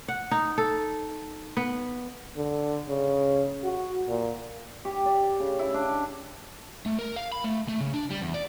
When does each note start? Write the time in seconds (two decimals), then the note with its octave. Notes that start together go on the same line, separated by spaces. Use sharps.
0.08 F#5
0.31 D#4
0.58 A4
1.57 B3
2.36 D3
2.89 C#3
3.64 F#4
4.08 A#2
4.85 G4
5.06 D5
5.40 C#3
5.59 E4
5.74 D4
6.86 A3
6.99 A#4
7.16 F5
7.32 B5
7.44 A3
7.68 A3
7.80 C#3
7.94 D4
8.10 G3
8.21 E2
8.34 D5